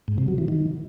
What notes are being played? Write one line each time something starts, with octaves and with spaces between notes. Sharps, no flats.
G#2
C3
F#3
E3
D#3